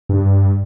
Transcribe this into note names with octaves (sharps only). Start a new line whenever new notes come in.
G2